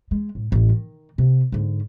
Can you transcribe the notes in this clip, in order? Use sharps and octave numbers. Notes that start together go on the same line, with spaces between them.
G#3
A2
A1
D#3
C3
G#2 D3